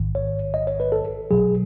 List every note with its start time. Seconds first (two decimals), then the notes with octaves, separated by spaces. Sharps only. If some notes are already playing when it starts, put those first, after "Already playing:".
Already playing: A1 G#2 D#3
0.15 C#5
0.54 D#5
0.67 C#5
0.80 B4
0.92 A4
1.31 B1 B2 F#3 G#4